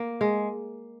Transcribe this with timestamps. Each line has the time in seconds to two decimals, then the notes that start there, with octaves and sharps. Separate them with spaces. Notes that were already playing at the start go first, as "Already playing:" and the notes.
Already playing: A#3
0.21 G#3